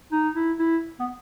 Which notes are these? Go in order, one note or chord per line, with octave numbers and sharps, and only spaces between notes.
D#4
E4
E4
B3